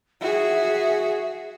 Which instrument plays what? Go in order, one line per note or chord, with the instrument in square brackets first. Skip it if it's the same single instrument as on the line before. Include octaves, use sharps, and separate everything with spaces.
[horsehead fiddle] F#4 G#4 [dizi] E5